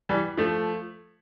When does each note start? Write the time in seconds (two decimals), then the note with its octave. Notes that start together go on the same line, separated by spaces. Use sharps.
0.09 E3 G3
0.37 F3 A3